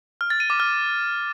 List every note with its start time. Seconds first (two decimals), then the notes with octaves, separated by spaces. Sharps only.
0.21 F6
0.30 A6
0.40 D#7
0.50 D6
0.60 F6